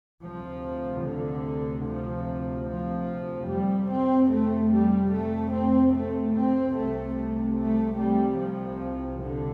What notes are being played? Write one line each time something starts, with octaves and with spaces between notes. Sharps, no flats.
D2 C3 F3
D3
F3
F3
F2 C3 G3
C4
A3
G3
A3
C4
A3
C4
C2 C3 A3
A3
A3
G3
F3
D3